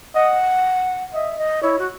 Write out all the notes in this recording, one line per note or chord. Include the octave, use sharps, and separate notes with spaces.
D#5 F#5
D#5 E5
D#5
E4 C#5
F#4